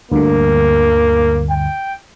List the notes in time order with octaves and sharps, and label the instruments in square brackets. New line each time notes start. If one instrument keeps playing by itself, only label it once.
[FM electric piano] D2 G2 D3 [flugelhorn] A#3
[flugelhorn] G5